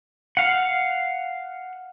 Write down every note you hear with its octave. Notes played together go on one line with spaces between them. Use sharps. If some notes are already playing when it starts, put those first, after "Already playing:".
F5 F#5